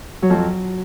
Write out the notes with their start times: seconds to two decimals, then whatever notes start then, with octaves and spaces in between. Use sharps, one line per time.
0.22 F#3
0.30 F2
0.37 F#3